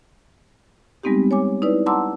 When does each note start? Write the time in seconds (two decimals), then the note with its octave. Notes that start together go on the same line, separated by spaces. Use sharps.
1.03 G3 G#3 B3 C4 D#4 G4
1.31 C#5 G#5 D6
1.62 D#4 E4 B4 D5
1.86 F#5 A5 A#5 C6 D6 E6